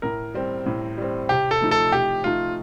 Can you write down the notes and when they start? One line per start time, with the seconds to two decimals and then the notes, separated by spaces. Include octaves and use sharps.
0.02 A2 A#4
0.34 G3 C4
0.66 A2
0.98 G3 C4
1.29 C3 G4
1.51 A4
1.61 F3 A3 D#4
1.71 A4
1.92 C3 G4
2.24 F3 A3 D#4 F4